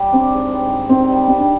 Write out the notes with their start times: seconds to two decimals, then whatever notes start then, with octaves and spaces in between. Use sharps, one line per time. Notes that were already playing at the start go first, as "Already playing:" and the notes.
Already playing: G3
0.12 C4 D4
0.32 G#2
0.51 G3
0.70 G#2
0.89 D#3 C4
1.10 G3
1.28 G3 C4
1.39 D4